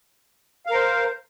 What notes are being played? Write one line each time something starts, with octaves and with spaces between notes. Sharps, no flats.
A#4 C5 F5